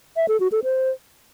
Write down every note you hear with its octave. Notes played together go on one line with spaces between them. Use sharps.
E5
A4
F#4
A4
C5